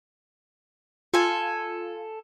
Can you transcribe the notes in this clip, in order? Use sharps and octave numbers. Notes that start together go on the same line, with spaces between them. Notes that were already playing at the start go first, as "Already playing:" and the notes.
F4 A4 G#5